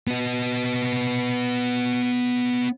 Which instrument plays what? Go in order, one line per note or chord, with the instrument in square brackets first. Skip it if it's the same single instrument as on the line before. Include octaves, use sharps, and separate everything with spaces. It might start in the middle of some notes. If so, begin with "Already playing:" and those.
[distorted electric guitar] B3 D#5